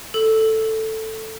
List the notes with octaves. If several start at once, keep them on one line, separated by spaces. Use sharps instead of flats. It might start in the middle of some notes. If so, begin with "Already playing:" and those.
A4